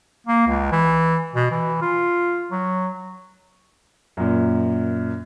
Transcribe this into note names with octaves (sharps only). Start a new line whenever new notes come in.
A#3
C#2
E3
B2
E3
F4
F#3
F#2 A#2